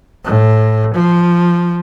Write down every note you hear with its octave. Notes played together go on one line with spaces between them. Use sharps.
A2
F3